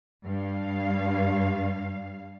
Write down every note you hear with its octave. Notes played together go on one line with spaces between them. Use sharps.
G2 G3 F5